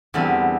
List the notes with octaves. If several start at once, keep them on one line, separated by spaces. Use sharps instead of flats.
E2 D3 G3 C4